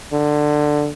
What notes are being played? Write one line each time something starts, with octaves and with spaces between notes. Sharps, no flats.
D3